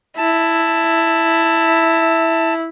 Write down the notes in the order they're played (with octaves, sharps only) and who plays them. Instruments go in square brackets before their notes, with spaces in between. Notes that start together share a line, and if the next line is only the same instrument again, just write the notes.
[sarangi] E4 [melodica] A5